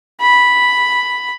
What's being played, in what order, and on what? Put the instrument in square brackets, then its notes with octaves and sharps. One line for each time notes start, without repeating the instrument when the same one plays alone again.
[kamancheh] B5